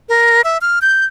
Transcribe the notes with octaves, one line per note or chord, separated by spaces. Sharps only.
A#4
E5
F6
G6